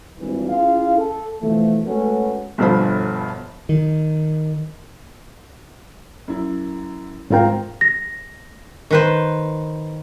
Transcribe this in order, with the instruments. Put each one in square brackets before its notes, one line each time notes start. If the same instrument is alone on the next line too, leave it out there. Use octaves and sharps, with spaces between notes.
[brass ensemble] G#1 G2 E3
C#4 E4 F4 G#4 F5
A4
B2 E3 F3 A3
G#3 A3 C#4 F#4 A4 B4
[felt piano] G1 G2 B2 F3 C5 B5
[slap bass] D#3
[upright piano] F#2 E4
[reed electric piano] G#2 F4 G5 [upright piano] C4 A#4 F5
[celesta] A#6
[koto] D#3 B4 C5